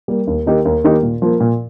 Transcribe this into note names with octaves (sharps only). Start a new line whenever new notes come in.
G3 A#3
D#2
D#3 A#3 D#4 G4
D#2
D#3 A#3 D#4 G4
A#2
F3 A#3
A#2